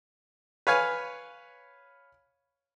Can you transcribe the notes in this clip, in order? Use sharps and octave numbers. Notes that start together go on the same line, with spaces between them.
B4 C#5 F5 G#5